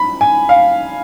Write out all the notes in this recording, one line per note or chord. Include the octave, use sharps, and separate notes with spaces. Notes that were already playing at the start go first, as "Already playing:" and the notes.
Already playing: B5
G#5
F5